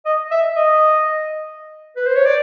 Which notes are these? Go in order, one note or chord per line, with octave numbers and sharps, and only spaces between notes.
D#5
E5
D#5
B4
C5
C#5
D5